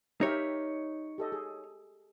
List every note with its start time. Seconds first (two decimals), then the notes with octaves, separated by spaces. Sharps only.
0.21 D#4 G4 A#4 C#5 E5
1.18 G4 A4 D#5
1.32 G#4